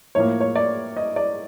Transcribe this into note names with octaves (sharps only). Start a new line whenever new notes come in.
A2 F3 A#3 C#5
C#5
D5
D#5
D5